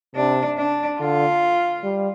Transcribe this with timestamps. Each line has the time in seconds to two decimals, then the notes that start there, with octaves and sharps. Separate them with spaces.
0.15 C3 D4
0.58 D4
1.00 D3 F4
1.83 G3